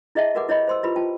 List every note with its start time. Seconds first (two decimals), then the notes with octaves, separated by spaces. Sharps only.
0.15 E4 G#4 D#5 E5 F#5 A5
0.35 F#4 G4 A#4 B4 F#5 D6
0.49 E4 C#5 D#5 B5
0.67 C5 C6 E6
0.83 E4 F4 G4 B4 B5
0.96 F4 G5 A5